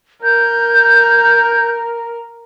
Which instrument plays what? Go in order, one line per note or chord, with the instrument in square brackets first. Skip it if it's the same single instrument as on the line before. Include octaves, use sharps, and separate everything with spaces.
[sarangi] A#4 [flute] G6